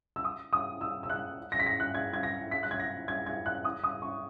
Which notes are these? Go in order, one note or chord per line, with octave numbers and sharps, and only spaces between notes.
E6
D#6
D#6
E6
E6
F#6
A#6
B6
A#6
F#6
G#6
G#6
A#6
B6
F#6
G#6
A#6
G#6
G#6
F#6
D#6
D#6
C#6